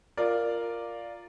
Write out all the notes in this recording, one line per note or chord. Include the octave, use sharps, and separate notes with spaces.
F4 A#4 D5